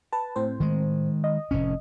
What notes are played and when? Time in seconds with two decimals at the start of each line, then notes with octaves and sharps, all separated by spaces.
0.12 B4 A5
0.36 A2 C4 C5
0.60 D#3 G#3
1.24 D#5
1.51 F1 A2 C#4